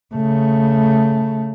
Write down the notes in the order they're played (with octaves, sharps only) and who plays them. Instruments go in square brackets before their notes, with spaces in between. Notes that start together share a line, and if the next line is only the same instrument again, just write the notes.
[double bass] C#3 A3